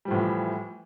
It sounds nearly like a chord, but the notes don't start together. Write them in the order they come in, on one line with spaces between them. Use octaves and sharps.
G3 F3 A2 E3